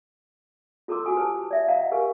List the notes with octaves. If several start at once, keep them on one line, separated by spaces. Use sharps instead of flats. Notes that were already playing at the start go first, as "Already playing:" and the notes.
F4 A4 A#5 C6 D6 E6
F#4 G#5 D#6
G4 B4 G#5 A5
D5 E5
D#5 F5 F#5 A#5
G4 A#4 B4 F5 G#5 C#6